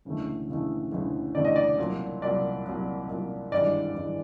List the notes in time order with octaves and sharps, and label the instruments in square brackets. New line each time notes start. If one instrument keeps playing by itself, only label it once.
[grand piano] E1 D2 C#3 E3 A3
E1 D2 C#3 E3 A3
E1 D2 C#3 E3 A3
E1 D2 C#3 E3 A3 D5
D#5
D5
C2 A#2 F#3
C2 A#2 F#3 D5
C2 A#2 F#3
C2 A#2 F#3
G#1 G2 E3 G#3 D5
G#1 G2 E3 G#3